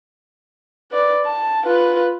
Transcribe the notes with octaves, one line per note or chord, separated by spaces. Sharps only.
B4 D5
A5
F4 B4